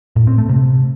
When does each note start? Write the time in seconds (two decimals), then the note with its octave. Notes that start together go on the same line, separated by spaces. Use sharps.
0.16 A2
0.27 C4
0.38 A3
0.49 C3